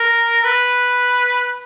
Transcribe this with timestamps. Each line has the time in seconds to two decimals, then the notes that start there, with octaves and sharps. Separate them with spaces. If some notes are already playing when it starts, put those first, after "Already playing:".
Already playing: A#4
0.44 B4